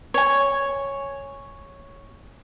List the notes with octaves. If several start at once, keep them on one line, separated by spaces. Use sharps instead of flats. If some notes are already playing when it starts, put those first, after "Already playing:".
C#5 G#5